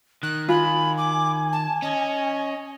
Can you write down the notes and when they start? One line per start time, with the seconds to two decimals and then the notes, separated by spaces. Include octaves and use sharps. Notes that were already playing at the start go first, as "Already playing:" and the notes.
0.23 D#3 F#6
0.49 F4 G#5 B5
0.98 D6
1.52 A5
1.82 C#4 D#5